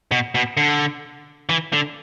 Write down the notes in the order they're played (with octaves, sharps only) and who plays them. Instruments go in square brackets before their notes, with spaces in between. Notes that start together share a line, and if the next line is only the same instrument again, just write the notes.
[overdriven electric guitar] B2
B2
D3
E3
D3